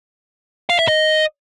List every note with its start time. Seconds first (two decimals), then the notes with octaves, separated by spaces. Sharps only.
0.70 F5
0.79 E5
0.88 D#5